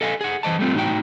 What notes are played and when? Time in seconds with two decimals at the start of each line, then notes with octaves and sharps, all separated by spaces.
0.01 A4 D#5 F5 G#5
0.21 G#4 F#5
0.43 E3 C5 D#5 A5
0.59 G3 A3 C4 F4
0.75 A2 D#4 F#4 G5